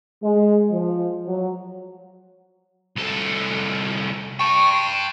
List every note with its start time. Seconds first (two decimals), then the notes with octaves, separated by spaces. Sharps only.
0.22 G#3
0.71 F3
1.27 F#3
2.96 C2 A4
4.39 G5 A5 C#6
4.71 C6